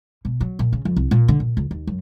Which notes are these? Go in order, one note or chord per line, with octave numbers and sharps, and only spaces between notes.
B2
F#3
A#2
C#3
F2
C2
A#2
D3
A#2
C#2
D#2
F#2